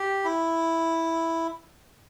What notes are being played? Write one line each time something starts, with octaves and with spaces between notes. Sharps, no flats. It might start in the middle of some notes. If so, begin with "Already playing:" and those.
Already playing: G4
E4